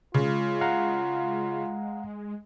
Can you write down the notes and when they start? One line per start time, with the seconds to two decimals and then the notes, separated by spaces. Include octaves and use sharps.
0.14 C#3 G#3 F4
0.61 F5 F#5 A#5